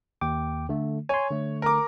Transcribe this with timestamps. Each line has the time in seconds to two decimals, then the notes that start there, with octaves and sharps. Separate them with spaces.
0.21 D#2 G5 D6
0.69 D3 A3
1.09 C#5 G#5 C6
1.31 D3 A3
1.62 A#4 D6